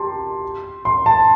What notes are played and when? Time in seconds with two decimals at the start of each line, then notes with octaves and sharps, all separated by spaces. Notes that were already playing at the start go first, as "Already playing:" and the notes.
Already playing: G4 A5 C6
0.85 C6
1.06 A5